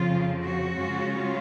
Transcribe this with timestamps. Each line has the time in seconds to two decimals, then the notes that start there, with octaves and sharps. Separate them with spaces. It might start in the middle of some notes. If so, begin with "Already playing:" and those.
Already playing: F2 C#3 F3 C4 F4
0.44 F#4
0.77 F#2 C#3 G#3 C#4 F4